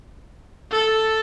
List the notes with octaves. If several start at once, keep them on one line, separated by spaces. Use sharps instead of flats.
A4